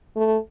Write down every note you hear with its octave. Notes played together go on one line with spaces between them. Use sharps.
A3